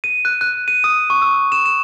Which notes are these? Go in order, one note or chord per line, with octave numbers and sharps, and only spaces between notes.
D#7
F#6
F#6
D#7
D#6
C#6
E6
E7
E7